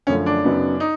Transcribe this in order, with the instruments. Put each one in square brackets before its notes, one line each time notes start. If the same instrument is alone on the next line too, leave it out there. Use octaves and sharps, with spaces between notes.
[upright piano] F#2 D3 F3 A3 [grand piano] C#4
[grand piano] D4
[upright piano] F#2 C#3 F#3 B3 D#4
[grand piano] D#4